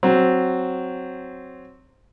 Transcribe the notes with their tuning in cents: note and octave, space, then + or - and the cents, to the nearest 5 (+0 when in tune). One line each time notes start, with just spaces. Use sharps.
F#3 +0 C4 +0